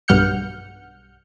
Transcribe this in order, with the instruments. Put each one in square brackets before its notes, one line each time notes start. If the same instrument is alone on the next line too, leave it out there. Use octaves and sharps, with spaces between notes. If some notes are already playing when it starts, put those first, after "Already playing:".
[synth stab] B1 G2 F#5 F6 G6 C#7